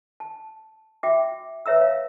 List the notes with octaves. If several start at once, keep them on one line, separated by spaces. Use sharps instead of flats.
A5
F#4 E5 G5 D6
B4 C#5 E5 A#5 E6
C#5 F5